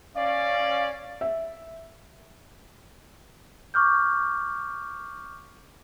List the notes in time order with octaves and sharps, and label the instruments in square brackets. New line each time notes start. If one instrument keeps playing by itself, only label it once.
[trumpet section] C#4 D5 [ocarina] F5
[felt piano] E5
[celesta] C#6 D6 F6 G6